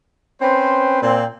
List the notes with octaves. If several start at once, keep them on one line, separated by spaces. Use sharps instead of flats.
C4 C#4 B4 C5
A#2 C4